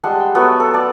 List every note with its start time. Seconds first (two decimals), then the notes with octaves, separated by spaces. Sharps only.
0.03 G3 G#3 F#5 A5
0.20 G5
0.35 F#3 A3 B3
0.60 A4
0.73 D5 A5